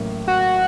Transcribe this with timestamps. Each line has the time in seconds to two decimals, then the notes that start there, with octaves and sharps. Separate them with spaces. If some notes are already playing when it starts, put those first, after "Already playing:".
Already playing: A1 A2 F#3 A#3
0.28 F#4